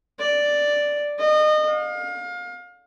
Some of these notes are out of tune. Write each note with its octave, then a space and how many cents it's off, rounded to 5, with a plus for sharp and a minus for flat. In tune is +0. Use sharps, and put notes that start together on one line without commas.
D5 +0
D#5 -30
F5 +30